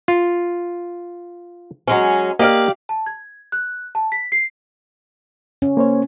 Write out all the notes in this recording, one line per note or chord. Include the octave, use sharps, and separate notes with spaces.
F4
F#3 G#3 C#4
A#3 G4 D5 D#5 F5
A5
G#6
F#6
A5
B6
C7
C#4
A#3 C5 C#5